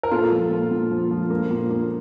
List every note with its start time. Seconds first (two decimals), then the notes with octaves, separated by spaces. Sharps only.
0.03 A#4
0.11 A#2 F4 A4
0.31 F3
0.51 A#2
0.71 A#2
0.91 F3
1.11 F3
1.30 A#3
1.51 A#2
1.70 A#3